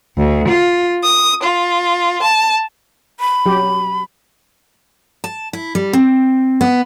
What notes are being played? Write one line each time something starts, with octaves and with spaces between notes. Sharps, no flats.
D2
F4
D#6
F4
A5
B5
F#3 G4
A5
E4
G3
C4
B3